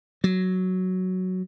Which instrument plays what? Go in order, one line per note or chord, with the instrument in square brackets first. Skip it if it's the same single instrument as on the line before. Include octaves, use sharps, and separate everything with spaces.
[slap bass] F#3